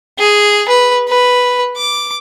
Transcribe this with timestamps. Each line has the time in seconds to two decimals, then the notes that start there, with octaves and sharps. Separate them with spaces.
0.19 G#4
0.69 B4
1.08 B4
1.77 D6